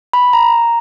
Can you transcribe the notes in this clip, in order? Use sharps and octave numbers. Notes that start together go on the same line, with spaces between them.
B5
A#5